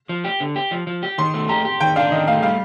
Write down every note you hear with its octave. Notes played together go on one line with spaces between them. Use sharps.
F3
G4
D3
G4
F3
F3
G4
D#3 C6
A3
G4 A#5
G4
D#3 G5
D4 F5
D#3 D#5
A3 F5
G3 F5